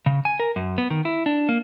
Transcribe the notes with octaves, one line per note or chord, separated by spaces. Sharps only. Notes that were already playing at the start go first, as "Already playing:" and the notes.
C#3
G#5
A#4
F#2
B3
D#3
E4
D4
A#3